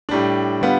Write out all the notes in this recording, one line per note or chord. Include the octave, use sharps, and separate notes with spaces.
A2 G3 D4
D3 G3 B3 F4